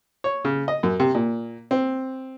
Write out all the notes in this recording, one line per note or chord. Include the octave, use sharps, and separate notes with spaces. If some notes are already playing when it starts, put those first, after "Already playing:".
C#5
C#3
D#5
F#2
C3
A#2
C4